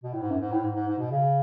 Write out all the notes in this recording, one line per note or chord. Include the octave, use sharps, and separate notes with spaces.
B2
A2
G#2
F#2
G#2
A2
G#2
G#2
G#2
B2
C#3